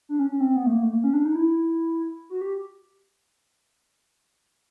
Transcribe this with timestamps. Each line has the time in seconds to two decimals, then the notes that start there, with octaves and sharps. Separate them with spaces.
0.09 D4
0.19 C#4
0.30 C#4
0.40 C4
0.56 B3
0.66 A3
0.72 A#3
0.83 A3
0.93 A#3
1.04 C#4
1.14 D4
1.25 D#4
1.35 E4
2.30 F#4
2.41 G4